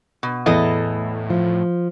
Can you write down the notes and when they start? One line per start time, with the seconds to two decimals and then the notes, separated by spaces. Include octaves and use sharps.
0.23 B2
0.46 E2 A2 E4 A4 D#5
1.30 F3